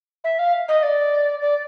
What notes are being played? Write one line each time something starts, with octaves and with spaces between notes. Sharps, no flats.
E5
F5
D#5
D5
D5